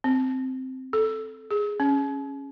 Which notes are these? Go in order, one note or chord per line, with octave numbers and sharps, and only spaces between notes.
C4
A4
G#4
C#4